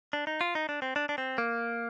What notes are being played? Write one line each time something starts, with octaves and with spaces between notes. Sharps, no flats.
D4
D#4
F4
D#4
D4
C4
D4
D4
C4
A#3